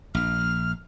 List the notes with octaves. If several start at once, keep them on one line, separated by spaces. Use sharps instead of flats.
A#1 F6